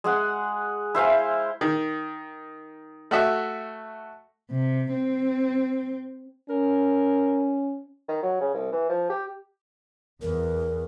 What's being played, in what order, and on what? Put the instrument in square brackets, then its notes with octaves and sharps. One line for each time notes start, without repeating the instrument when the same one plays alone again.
[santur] G#3 G#4 F#5
E4 C5 F5 G#5
[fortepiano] D#3
A3 F#4 E5
[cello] C3
C4
[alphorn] C#4 [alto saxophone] A#4
[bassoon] D#3
F#3
C#3
C2
E3
F3
G4
[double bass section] E2 [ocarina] A#4